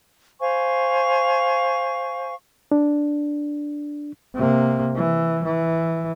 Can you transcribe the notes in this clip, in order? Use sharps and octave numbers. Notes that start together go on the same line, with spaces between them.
C5 F5 G#5 C#6
D4
C3 A#3
E3
E3